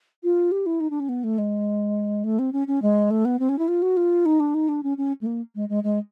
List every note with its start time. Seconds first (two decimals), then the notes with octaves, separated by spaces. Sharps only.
0.23 F4
0.51 G4
0.66 E4
0.80 D#4
0.90 D4
1.00 C#4
1.09 B3
1.24 A3
1.38 G#3
2.24 A3
2.39 C4
2.53 C#4
2.67 C#4
2.82 G#3
3.10 A3
3.25 B3
3.39 C4
3.49 C#4
3.59 E4
3.68 F4
3.82 F#4
3.97 F4
4.25 D#4
4.40 D4
4.54 D#4
4.68 D4
4.83 C#4
4.97 C#4
5.21 A3
5.26 A#3
5.55 G#3
5.69 G#3
5.83 G#3